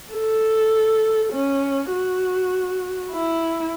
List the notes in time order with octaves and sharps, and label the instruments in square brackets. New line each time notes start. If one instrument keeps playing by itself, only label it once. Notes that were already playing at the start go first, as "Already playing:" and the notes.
[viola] A4
C#4
F#4
E4